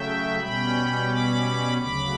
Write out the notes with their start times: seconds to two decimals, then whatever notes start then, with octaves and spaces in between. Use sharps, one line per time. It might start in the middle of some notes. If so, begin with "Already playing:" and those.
Already playing: C#3 F#3 A3 E5 G5
0.39 B2 G3 C#4 G5 B5
1.09 B5 D6
1.78 D2 C#3 F#3 B5 D6